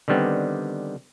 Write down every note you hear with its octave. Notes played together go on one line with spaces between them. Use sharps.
D3 D#3 G3 B3 C4